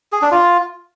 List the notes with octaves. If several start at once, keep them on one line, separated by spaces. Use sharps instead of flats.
G#4
D4
F4